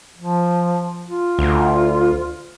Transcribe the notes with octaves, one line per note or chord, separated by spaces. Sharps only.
F3
F4
D2